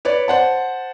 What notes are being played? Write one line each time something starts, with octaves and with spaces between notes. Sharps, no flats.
B4 C#5 D5
C5 F#5 A5